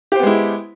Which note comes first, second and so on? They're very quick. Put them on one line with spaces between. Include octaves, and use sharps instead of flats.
G4 C5 B3 G#3 E4